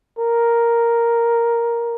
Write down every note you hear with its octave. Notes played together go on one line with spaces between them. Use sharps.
A#4